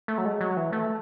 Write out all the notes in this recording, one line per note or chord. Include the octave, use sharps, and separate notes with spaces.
A3
F#3
G#3
F#3
E3
A3